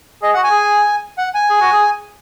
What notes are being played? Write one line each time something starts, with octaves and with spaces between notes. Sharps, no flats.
G#4 D#5
F#5
F#4
G#5
G#4
F#5
G#5
G#4
F#4
G#4